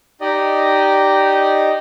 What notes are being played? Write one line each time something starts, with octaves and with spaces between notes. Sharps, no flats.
D#4 G4 D5 D#5